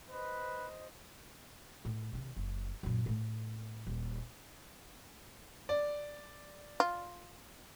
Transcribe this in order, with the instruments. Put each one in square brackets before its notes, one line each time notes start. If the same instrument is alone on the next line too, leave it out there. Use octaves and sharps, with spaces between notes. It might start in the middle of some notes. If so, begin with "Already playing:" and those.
[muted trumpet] B4 [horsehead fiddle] C5 D#5
[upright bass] A2
C3 D#3
F#1
F#2 A#2
A2 A3
D#1
[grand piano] D5
[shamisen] F4